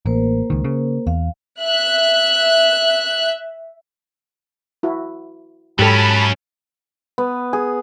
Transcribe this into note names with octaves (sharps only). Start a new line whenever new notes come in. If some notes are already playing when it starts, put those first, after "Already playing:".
A1 A#3 A#4 C5
C#2 D#3
C#3
E2 F5
E5 F#6
E4 F#4
G#2 F#3 C#4 G4 A4 A5 B5
B3
G#4